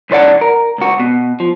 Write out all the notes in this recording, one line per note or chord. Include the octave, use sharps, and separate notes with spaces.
C2 E3 C5 D5 F#5
A#4
C#2 F#4
B2
F3